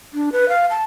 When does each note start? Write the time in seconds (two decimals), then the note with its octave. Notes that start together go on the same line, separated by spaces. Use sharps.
0.14 D4
0.32 B4
0.49 F5
0.70 A5